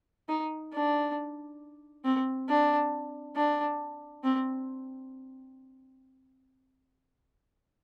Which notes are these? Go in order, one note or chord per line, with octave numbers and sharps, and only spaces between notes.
D#4
D4
C4
D4
D4
C4